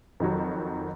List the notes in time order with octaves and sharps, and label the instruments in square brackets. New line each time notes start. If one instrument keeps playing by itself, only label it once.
[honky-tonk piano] F2 D#3 F#3